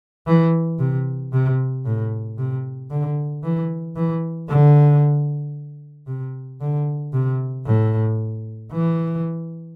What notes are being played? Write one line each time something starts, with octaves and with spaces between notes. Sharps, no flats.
E3
C3
C3
A2
C3
D3
E3
E3
D3
C3
D3
C3
A2
E3